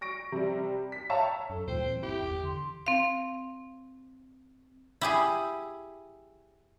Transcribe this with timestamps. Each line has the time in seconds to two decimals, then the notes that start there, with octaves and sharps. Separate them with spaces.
0.01 C#6 A#6 D7
0.32 C3 G3
0.92 B6
1.10 C#5 E5 F5 G5 A5 A#5
1.50 F#2 A4
1.68 D2 A#2 E3 G3 C5 G5
1.87 E3 A#3 C4
2.03 G1 E4 G4
2.23 E2
2.43 D3 C6
2.87 C4 F5
5.01 E4 G4 G#4